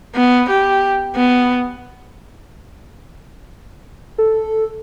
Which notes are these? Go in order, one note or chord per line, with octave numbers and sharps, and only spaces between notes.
B3
G4
B3
A4